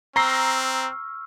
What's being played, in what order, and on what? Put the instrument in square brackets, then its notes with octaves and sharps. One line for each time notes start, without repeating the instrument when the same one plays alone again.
[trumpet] C4 [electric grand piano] A#5 A#6 C7 [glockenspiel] C#6 E6 F6